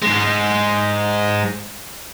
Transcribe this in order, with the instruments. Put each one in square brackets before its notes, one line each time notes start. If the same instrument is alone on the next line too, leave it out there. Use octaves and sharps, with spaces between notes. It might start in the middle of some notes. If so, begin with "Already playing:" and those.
[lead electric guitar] G#2 G#3